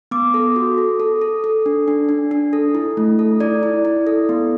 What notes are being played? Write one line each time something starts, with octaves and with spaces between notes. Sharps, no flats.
B3 D6
A4
F#4
A4
A4
A4
A4
D4
D4
D4
D4
A4
E4
A3
A4
E4 D5
E4
E4
A4
B3